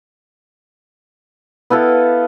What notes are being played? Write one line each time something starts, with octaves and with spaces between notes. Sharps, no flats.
B3 E4 A4 F5